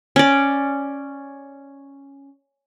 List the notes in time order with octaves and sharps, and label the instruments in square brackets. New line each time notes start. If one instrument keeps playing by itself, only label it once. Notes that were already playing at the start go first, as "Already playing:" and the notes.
[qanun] C#4 D5